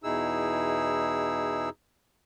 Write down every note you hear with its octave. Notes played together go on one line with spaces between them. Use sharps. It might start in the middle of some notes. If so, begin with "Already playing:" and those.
E2 B2 D#4 E4 G#4 E6